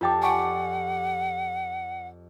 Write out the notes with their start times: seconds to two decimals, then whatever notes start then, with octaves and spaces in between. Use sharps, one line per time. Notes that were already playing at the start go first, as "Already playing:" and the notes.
0.01 F2 F4 G4 G5 A5 D6
0.22 D5 F#5 G#5 B5 C#6 D6